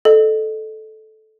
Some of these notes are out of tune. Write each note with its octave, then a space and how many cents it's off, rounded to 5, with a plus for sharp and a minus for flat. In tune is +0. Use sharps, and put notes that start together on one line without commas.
A4 -10 D#5 -35